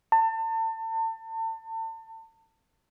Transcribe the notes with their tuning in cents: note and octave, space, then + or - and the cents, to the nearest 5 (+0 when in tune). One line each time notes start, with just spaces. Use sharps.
A5 +35